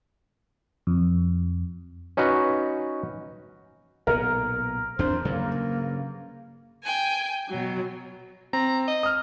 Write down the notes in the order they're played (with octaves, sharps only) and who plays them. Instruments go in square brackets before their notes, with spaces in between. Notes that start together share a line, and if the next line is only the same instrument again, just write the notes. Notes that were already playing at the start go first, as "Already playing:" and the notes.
[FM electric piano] F2
[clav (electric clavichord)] C#4 D#4 F#4 B4
[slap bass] B1 A#2 B3 [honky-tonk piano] A#4
[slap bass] E2 C4 D4 [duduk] C5
[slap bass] G2 C#3 F#3 [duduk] A#3
[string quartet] G5 G#5
B2 F#3
[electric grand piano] C4 [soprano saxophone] A#5
[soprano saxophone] D#5
[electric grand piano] D#6 F6